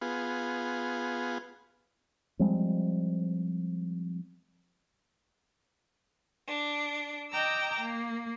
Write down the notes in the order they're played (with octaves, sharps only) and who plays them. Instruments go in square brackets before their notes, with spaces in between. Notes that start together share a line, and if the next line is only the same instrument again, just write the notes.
[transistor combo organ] B3 F4 G#4
[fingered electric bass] F3 G3 G#3 C4
[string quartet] D4
D#5 G5 A#5 D6 E6
A#3